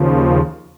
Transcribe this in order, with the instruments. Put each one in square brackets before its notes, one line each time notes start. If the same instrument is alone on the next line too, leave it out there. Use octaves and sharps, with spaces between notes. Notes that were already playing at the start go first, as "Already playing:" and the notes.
Already playing: [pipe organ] D#2 C#3 F3